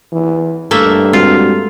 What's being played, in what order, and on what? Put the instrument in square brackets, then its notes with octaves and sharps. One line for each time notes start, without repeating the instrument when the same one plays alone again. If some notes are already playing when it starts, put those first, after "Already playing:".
[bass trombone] E3
[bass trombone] G2 [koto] A3 A#3 E5
[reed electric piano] G#3 C4 F#4 [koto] F4